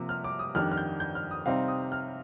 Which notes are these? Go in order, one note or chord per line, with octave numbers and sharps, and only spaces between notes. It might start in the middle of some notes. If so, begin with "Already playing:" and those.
Already playing: C3 F3 A#3
F6
D6
D#6
F2 D#3 G3 D4 F6
F6
G6
G6
F6
D#6
C3 G3 C4 D#4 F5
D#6
F6